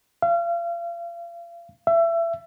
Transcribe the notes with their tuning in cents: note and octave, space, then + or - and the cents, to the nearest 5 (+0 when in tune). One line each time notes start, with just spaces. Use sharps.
F5 -35
E5 +25